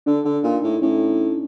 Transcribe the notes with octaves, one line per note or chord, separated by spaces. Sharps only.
D3 D4
D3
A#2 D#4
A2
A2 C#4